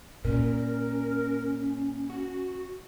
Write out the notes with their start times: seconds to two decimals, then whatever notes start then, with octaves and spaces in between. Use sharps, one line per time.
0.25 A#2 C#4 A#4
2.10 F#4